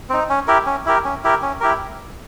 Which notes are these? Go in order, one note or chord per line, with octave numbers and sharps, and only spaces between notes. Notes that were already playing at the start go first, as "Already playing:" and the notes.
C4 D#4
C#4
E4 G4 A#4
C#4
E4 G4 A#4
C#4
E4 G4 A#4
C#4
E4 G4 A#4